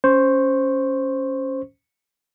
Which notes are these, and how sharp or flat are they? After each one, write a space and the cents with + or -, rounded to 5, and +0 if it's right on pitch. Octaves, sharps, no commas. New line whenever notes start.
C#4 +0 C5 +0 C#6 -15